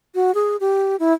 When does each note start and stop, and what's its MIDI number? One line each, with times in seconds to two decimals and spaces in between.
0.15 0.34 66
0.34 0.57 68
0.60 0.96 67
1.00 1.13 64